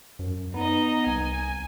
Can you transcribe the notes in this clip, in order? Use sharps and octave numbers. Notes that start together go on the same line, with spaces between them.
F#2
B3 D#4 D#5
C2 G#5